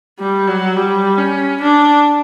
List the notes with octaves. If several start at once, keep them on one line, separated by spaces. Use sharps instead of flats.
G3
F#3
G3
C#4
D4